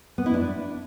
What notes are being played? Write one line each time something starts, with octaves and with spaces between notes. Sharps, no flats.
B3
E4
D4